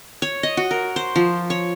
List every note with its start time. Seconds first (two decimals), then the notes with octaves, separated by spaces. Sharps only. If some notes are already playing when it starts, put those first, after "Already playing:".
0.22 C#5
0.43 D#5
0.57 F#4
0.71 A#4
0.96 C5
1.16 F3
1.50 C#5